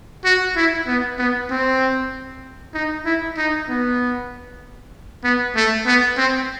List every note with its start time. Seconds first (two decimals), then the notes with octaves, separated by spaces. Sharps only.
0.25 F#4
0.56 E4
0.87 B3
1.19 B3
1.50 C4
2.74 D#4
3.05 E4
3.37 D#4
3.69 B3
5.24 B3
5.55 A3
5.86 B3
6.17 C4